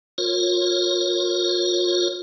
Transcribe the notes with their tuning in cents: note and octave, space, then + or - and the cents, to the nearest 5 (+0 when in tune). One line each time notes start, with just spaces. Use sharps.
F4 +30 A#4 +0 C#5 -20